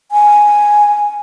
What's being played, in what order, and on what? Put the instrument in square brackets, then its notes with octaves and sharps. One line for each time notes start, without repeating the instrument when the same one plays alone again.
[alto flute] G#5